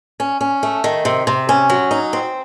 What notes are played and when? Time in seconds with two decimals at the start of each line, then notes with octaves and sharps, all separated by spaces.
0.20 C#4
0.41 C#4
0.63 A3
0.84 D#3
1.05 C3
1.27 C3
1.49 C#4
1.70 F#3
1.91 D#4
2.13 C4